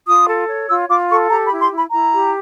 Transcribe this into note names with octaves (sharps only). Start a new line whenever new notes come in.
F4 D#6
A4
C#5
F4 E6
F4 D6
A4 C#6
G4 A#5
B5
E4
C6
E4
B5
E4 A#5
G4